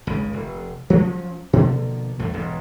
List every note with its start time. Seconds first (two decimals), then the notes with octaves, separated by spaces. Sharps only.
0.07 G#1 C#2 C#3
0.33 F1
0.90 F3 F#3 A#3 C#4
1.53 B2 D3 F3 A#3
2.19 E2 G2 A3
2.34 E1 B1 G#2